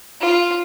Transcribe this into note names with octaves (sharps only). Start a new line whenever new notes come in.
F4